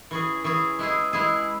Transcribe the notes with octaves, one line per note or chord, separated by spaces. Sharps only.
E3 C#4 G#4
E3 C#4 G#4
G#3 E4 G#4
G#3 E4 G#4